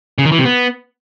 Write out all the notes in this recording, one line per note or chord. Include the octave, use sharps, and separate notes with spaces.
C#3
D#3
E3
C3
B3